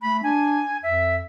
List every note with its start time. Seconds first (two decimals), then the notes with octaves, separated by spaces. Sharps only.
0.02 A3 B5
0.23 D4 G#5
0.83 F2 E5